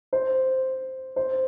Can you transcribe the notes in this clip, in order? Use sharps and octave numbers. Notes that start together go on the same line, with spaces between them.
C5
C5